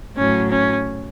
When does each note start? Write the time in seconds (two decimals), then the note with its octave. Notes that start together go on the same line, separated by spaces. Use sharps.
0.16 A2 F#3 C#4
0.49 C#4